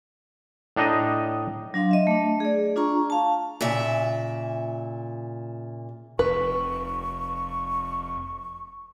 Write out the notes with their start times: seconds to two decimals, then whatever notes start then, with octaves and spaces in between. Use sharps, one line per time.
0.76 A2 D4 D#4 D#5
1.74 F#3 D4 F5 C6
1.91 D#5 E5
2.07 A3 D4
2.40 G#4 D5
2.76 D4 F4 A#5 C#6
3.10 F5 A5
3.61 A#2 C#3 E5
6.19 F1 B4 C#6